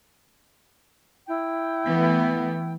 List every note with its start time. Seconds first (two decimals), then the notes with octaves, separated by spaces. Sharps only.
1.27 E4 G5
1.85 E3 A3 B3